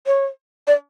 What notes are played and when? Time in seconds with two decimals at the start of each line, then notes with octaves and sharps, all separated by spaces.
0.07 C#5
0.68 D5